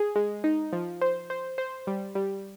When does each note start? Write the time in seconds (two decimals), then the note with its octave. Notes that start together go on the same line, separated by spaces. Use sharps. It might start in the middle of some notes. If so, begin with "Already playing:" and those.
Already playing: G#4
0.16 G#3
0.44 D#4
0.73 F3
1.01 C5
1.30 C5
1.58 C5
1.87 G3
2.15 G3